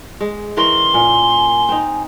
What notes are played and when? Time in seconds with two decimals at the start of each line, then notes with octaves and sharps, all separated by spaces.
0.21 G#3
0.57 E3 C#4 A#4 C6
0.94 A#2 G#5
1.69 C4 D#4